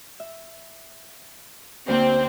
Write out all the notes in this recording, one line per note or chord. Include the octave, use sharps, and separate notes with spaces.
E5
D2 A#3 C4 C6